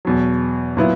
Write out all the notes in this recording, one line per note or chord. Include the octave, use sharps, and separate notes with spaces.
E2 B2 F#3
A#2 F#3 B3 E4